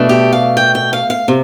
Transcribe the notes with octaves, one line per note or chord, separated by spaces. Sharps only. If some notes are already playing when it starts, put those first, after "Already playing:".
Already playing: B2 A3 D4
G4
F5
G5
G5
F5
F5
C3